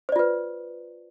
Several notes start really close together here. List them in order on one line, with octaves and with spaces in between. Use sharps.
C5 D5 F4 B4